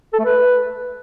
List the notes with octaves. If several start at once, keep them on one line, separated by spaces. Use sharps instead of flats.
A4
A3
B4